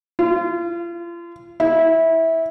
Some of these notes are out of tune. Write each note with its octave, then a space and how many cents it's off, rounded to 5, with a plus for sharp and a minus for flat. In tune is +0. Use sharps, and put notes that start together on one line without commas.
F4 -35
E4 -15